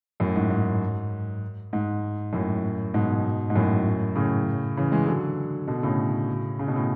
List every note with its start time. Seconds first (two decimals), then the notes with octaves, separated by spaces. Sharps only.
0.20 F#2 A2
0.36 G#2
0.50 G#2
1.73 G#2
2.33 F#2 A2
2.94 G#2 B2
3.50 G#2
3.56 F#2 A2
4.15 A2 C#3
4.77 C#3 E3
4.92 E3 G#3
5.07 D3 F#3
5.68 B2 D3
5.83 A2 C#3
6.59 C#3
6.68 B2
6.76 A2